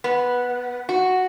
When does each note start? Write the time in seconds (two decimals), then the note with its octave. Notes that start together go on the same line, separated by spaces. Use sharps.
0.04 B3
0.89 F#4